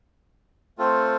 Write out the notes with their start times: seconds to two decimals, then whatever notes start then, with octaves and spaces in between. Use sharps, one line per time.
0.78 A3 C4 F4 A4 C5